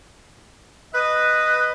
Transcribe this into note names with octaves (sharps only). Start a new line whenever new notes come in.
B4 D#5